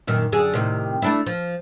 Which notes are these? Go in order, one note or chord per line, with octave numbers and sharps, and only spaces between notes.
F#2 A#2 D#3
F#2 D3 G#4
A2 C3 D#3
A3 D4 E4
F3